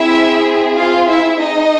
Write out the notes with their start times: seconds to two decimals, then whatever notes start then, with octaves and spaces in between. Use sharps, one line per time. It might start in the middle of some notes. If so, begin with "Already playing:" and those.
Already playing: C4 E4 G#4 E5
0.77 F4 F5
1.09 E4 E5
1.41 D#4 D#5